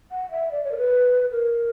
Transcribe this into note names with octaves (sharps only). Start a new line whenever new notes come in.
F#5
E5
D5
C#5
A#4
B4
A#4